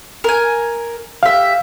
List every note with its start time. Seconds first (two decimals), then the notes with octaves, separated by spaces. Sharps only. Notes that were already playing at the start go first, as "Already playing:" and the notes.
0.24 A#4 G#5
1.23 G4 E5 F5